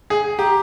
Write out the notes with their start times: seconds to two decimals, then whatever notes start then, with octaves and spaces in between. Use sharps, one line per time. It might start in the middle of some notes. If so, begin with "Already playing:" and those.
0.10 G#4
0.39 G4 A#5